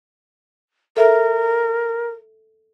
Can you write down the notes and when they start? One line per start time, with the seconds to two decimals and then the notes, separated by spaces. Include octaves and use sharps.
0.97 A4 A#4 E5